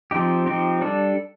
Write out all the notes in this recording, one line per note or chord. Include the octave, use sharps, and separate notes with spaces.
F3 C4 D#4 G4
F3 C4 D#4 G4
G3 D4 A4